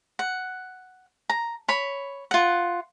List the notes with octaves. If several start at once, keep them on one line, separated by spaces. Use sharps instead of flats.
F#5
A#5
C#5 B5
F4 F#5